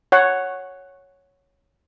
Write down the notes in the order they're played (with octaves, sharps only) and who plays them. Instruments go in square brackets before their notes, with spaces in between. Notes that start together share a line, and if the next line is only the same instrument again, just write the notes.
[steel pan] C#5 F#5